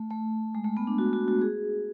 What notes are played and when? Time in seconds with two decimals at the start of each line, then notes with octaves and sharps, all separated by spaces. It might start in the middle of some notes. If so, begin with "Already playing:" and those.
Already playing: A3
0.10 A3
0.55 G#3
0.64 A3
0.77 B3
0.87 D4
0.98 F#4
1.13 F#4
1.28 F#4
1.42 G#4